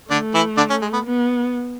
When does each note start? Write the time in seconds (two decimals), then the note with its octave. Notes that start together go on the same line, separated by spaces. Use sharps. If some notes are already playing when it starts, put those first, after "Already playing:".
0.10 D3 A3 D4
0.34 E3 E4
0.57 D3 D4
0.70 C#4
0.82 G#3
0.93 B3
1.05 B3